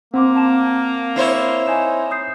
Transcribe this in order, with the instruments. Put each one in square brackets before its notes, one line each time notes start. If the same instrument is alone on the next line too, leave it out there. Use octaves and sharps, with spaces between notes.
[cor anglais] A#3 [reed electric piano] C4 [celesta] F#5 C6 D6
[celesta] F#5 A5 E7
[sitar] E4 C5 C#5
[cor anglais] D#4 [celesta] G#5 E7
[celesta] D#6 G6 C7